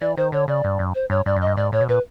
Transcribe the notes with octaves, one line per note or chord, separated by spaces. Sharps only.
E3 D5
D#3 C5
D3 C#5
C#3 D5
G2
F#2
C5
G2 C#5
G2 D5
F#2
D#5
G2
G#2 D5
A2 C#5
B2
A#2 B4